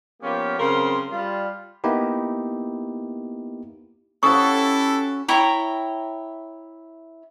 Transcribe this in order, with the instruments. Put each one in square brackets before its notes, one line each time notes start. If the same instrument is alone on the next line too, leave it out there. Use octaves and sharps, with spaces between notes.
[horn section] F3 A#3 B3 C#4 F4 G4
C#3 F#3 C4 A#4 C6
G3 F4
[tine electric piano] A#3 B3 D#4 E4 G4
[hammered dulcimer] C#4 F#4 [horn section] E4 G4 A4 [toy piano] C#6 D#6
[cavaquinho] E4 C#5 G5 A#5